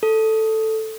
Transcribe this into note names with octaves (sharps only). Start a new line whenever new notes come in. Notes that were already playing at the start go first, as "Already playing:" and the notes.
A4